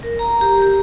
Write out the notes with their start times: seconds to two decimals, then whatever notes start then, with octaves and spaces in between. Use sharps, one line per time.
0.03 A#4
0.19 A#5
0.41 G4
0.62 G4